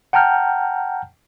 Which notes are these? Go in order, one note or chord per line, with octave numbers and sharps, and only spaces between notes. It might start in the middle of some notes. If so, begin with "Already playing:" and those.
F#5 G5 A5 A#5 F6 G6